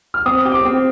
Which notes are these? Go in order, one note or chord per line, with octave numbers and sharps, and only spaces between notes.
F6
C4 D#6
G4
D6
C4